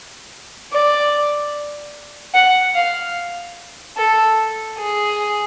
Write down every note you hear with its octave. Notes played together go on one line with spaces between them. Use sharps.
D5
F#5
F5
A4
G#4